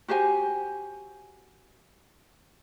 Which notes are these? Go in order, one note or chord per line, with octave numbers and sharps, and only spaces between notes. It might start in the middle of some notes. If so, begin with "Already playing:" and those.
F#4 G4 C5 G#5